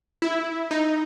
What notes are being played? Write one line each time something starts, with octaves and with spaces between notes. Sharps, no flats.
E4
D#4